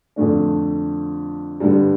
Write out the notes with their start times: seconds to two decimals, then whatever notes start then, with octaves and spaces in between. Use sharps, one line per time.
0.16 F2 D3 A3 D4
1.60 G2 D3 G3